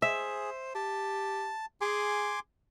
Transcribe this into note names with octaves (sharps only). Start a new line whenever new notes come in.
G#4 C5 E5
G4 A5
G#4 G#5 C6 D6